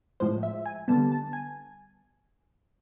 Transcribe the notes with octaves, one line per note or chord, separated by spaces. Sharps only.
A2 F3 G#3 C5
E5
G#5
D3 G3 B3 A5
A5
G#5